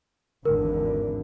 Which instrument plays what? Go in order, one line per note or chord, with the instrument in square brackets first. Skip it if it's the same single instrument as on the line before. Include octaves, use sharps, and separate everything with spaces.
[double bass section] G#1 E2 D3 [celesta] A#4